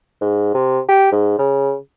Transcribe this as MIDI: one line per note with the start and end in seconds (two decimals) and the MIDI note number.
0.21 0.54 44
0.54 0.79 48
0.88 1.09 67
1.12 1.34 44
1.39 1.74 49